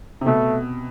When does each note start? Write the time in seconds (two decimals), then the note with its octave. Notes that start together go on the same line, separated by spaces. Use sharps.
0.21 C3
0.26 B2 A3